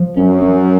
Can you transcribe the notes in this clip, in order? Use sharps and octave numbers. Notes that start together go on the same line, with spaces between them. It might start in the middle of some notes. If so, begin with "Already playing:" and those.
Already playing: F3
F#2 C#4
C#4